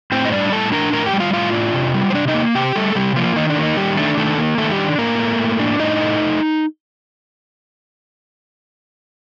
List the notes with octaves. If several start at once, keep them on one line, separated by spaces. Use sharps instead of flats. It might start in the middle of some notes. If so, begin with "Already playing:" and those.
A2 C4 C5
D#5
G3 D4 D5
A2 A4 A5
D4 A#4 A#5
A2 A#4 A#5
G4 G5
G3
F4 F5
A2 F4 F5
D4
C3
G3
C5
C3 D4 D5
D#4 D#5
A#3
C3 G4 G5
G3 A3 A4
C3 G3 G4
F3 A#3 F4
D#3 D#4
D4
A#3
D#4
D#3 G3 G4
A3 D4 A4
D#3 A3 A4
A#3
D#3 A3 A4
G3 G4
D4
A2 A#3 A#4
A3
A2
D4
A2 D#4 D#5
A3